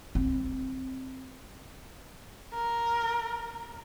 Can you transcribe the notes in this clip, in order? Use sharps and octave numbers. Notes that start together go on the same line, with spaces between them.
C4
A#4